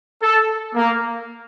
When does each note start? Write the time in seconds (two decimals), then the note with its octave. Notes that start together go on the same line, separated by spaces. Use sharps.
0.22 A4
0.76 A#3